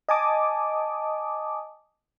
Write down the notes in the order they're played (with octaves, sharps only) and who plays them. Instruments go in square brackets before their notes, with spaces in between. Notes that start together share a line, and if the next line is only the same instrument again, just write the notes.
[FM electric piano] D#5 G#5 A5 D6 D#6